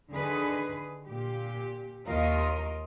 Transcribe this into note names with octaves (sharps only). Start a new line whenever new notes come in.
D3 D#3 G#4 B4
A#2 G4
D#2 D#3 F4 A#4 D#5